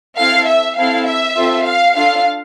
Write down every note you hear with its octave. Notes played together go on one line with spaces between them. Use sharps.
C4 E4 A4 F5
E5
C4 E4 A4 F5
E5
C4 F4 A4
F5
D4 F4 A4 F5